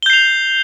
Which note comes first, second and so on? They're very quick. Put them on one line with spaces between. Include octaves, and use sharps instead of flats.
G7 G6 C7 F7